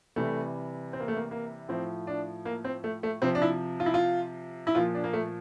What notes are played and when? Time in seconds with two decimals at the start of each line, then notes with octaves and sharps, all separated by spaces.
0.16 C3 E3 G3 A3
0.93 C4
1.00 A#3
1.08 A3
1.16 A#3
1.31 A#3
1.69 A2 F3 C4
2.07 D4
2.45 A#3
2.65 C4
2.84 A3
3.03 A3
3.22 C3 F3 C4
3.35 D4
3.42 E4
3.80 F4
3.86 E4
3.94 F4
4.67 E4
4.75 A#2 F3 F4
4.95 D4
5.04 A#3
5.13 A3